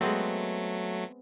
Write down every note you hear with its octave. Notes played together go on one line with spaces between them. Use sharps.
F#3 G#3 A3 B3 C4